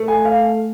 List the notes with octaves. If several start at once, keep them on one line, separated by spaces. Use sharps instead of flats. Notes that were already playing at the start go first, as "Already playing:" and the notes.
Already playing: A3
G#5
F5